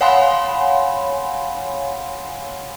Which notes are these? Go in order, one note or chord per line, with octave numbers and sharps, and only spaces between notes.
C#5 F5 F#5 G#5 B5 C6